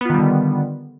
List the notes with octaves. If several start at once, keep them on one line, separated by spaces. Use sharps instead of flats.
D3 D#3 G3 B3 F4